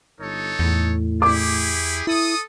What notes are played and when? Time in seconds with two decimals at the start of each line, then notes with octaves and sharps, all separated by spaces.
0.19 G1 D#4 A4 C#5
0.59 E2 A2
1.22 E4 G4 G#4 D6
2.07 E4 A4 D#6